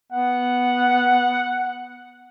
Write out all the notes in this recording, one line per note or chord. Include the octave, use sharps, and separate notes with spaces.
B3 F#5